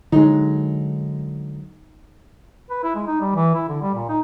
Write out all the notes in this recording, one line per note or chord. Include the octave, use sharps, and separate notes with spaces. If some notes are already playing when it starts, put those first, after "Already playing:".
D3 F#3 G#3 D#4
B4
E4
G#3
D#4
G3
E3
E4
D3
G3
A#2
D#4